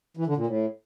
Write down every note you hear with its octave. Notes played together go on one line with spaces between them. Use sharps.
E3
D3
A#2
A2